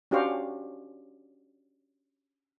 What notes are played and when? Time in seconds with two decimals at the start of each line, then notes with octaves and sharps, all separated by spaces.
0.11 C#4 D4 F#4 G4 C5 F5